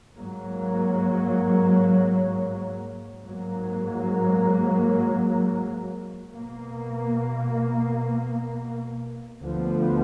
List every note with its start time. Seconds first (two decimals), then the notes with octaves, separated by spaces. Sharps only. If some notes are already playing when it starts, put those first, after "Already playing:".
0.16 G#2 F#3 A#3
3.24 G#2 F#3 A#3
6.33 B2 A#3
9.41 D2 D3 F3 B3